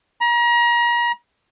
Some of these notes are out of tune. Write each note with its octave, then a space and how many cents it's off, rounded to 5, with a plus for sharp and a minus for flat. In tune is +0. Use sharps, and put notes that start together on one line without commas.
A#5 +35